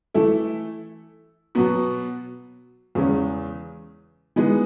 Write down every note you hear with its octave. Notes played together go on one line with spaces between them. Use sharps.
E3 A3 E4 A4
B2 F#3 B3 F#4
E2 C#3 G#3 C#4
E3 G#3 B3 D#4